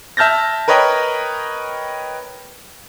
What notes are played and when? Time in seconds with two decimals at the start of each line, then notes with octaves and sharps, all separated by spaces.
0.17 E5 A5 F6 G6 A6 A#6
0.68 A#4 B4 C#5 D#5 G5 B5